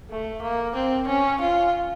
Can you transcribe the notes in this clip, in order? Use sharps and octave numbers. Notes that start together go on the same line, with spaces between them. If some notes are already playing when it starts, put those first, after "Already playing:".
A3
A#3
C4
C#4
F4